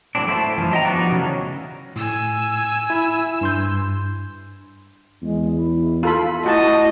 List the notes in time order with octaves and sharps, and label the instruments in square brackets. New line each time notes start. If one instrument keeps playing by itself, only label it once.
[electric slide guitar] A2 E3 F#3 C4 D4
A3 D#4 E4 C5 A5
F#2 E3 F3
D4 F#4 D#5 E5 G5 A#5
F3 G3 B3 D4 D#4 F#4
C#3 E3 F#3 A3 B3 C#4
[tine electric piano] A2 [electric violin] G#5 E6
[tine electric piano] E4 B5
G2 C6 G6
[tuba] E2 [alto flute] G#3
[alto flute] E4
[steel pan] F4 A4 B5
[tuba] A3 [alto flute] E4 [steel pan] F#4 A5 [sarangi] D#5